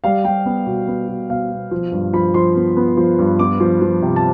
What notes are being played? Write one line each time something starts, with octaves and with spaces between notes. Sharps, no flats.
G3 F5
G3 G5
B3
B2
B3
B2
B2 F5
B2
F3
G2
F3 B5
F3 C6
B3
B3
F3
G2
B3 D6
F3
F3
C3
A5